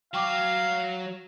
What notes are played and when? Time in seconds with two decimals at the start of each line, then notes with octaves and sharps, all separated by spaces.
0.14 F#3 F5 G5 C#6 D6